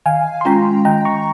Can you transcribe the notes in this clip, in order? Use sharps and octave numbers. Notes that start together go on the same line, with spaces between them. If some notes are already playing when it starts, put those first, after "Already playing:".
D#3 F5 G#5
C6
G#3 C#4 F4 G5 A#5
D#3 G5 A#5
A#5 C#6